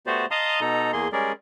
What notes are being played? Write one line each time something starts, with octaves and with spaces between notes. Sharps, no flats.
A3 B3 F#4 G4 C5 D5
D#5 F5 A5 A#5 C6 D#6
B2 D#4 A4 A#5
E2 A#3 G#4 C6
G3 G#3 C#4 G#4 A#4 D5